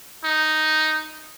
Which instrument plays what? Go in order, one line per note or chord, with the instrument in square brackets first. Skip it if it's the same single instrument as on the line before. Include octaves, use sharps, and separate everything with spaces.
[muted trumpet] D#4